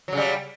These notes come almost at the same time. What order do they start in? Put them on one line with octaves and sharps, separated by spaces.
F#3 C#3 G3